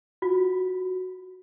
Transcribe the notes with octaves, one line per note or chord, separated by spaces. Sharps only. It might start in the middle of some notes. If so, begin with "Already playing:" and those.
F4 F#4